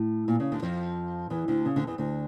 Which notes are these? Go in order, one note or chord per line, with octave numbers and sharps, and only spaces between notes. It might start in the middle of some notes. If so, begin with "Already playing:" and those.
Already playing: A2
A#2
C#3
D2 D3
F2 F3
E2 E3
D2 D3
C#3
D2 D3
E2 E3
D2 D3